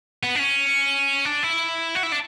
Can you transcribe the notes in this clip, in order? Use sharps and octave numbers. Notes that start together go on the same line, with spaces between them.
B3
D4
C#4
D4
E4
F#4
E4
D4